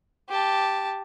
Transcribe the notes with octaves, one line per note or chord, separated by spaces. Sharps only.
G4 A5